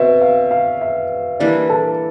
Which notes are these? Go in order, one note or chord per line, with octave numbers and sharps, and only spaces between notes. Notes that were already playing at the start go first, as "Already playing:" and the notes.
Already playing: B2 C4 E5
F5
F5
E5
E3 G3 A#3 D4 D5
A4